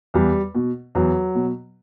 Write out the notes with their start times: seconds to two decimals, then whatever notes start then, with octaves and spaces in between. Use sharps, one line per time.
0.14 E2 G3
0.55 B2
0.95 E2 F#3
1.35 B2